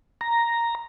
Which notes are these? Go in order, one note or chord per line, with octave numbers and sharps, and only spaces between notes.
A#5